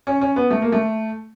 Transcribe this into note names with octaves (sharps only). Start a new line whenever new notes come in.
C#4
C#4
B3
A3
A#3
A3